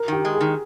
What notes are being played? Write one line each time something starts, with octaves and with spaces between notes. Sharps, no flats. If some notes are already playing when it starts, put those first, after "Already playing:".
Already playing: A#4
D#3 G4
G#3
G#4
D#3